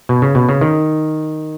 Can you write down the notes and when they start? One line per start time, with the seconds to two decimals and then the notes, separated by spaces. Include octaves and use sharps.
0.09 B2
0.22 C#3
0.35 B2
0.49 C#3
0.61 D#3